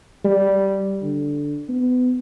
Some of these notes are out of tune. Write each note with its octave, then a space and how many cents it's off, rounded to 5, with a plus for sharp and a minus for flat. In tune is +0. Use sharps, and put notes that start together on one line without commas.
G3 -10
D3 -5
B3 +25